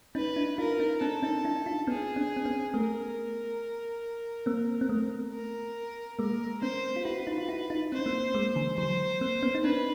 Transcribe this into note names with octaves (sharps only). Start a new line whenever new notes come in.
C#4 D#4 B4
D4 E4
D#4 F4 A#4
C#4 D#4
C4 D4 A4
C#4 D#4
D4 E4
D#4 F4
B3 C#4 G#4
C4 D4
C4
B3 C#4
A3 B3 A#4
A#3 C4
C4
A3 B3
A#4
G#3 A#3 A#4
B3 C#4 C5
F4
E4 F#4 B4
D#4 F4
F4
E4 F#4
D#4 F4
C4 C5
C#4
A#3 C4
G#3 A#3
D3 E3
E3 F#3 C5
A#3 C4
B3 C#4
D#4
C4 D4 B4